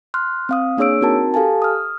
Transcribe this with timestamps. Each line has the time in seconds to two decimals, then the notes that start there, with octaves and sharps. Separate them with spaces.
0.14 C6 F6 F#6
0.49 C4 F5 D#6
0.77 A#3 D4 G#4 C#5 E6 D7
1.01 C4 D#4 F#4 A#4 A5
1.34 G4 A4 F5 G#5 A5
1.62 D#6 F6